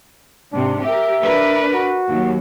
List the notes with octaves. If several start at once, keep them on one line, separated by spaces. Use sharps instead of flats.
G#2 C3 D4
G4 A#4 E5
D4 A#4 B4
F#4
D#2 F#3